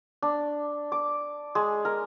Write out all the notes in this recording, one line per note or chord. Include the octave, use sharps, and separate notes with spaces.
D4
D6
G#3
A#4